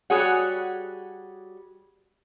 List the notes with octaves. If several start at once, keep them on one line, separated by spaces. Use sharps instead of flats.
G3 F#4 G#4 C#5 F#5